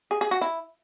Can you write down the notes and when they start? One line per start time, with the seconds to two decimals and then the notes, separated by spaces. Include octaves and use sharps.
0.11 G#4
0.21 G#4
0.31 F#4
0.41 E4